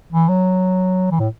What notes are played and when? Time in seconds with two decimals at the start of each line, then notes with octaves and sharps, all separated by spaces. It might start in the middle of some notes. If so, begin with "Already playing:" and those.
0.12 E3
0.29 F#3
1.11 E3
1.19 A2